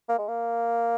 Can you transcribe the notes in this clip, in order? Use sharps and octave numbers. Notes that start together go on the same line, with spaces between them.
A#3
G#3
A#3